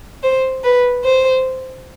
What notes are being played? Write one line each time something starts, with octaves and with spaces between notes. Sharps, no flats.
C5
B4
C5